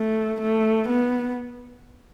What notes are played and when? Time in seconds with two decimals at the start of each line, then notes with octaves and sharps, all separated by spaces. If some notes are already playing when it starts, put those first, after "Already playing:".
Already playing: A3
0.41 A3
0.89 B3